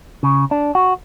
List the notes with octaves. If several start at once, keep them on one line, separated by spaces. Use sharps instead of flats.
C#3
D4
F#4